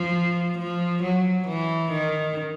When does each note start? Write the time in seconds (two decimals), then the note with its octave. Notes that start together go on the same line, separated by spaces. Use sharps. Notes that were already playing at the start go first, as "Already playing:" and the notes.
Already playing: F3
0.59 F3
1.03 F#3
1.48 E3
1.92 D#3